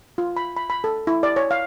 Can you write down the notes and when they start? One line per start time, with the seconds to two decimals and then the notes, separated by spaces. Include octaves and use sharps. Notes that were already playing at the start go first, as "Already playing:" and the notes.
0.18 F4
0.37 B5
0.57 B5
0.70 B5
0.84 A4
1.07 E4
1.23 D5
1.36 C#5
1.51 F5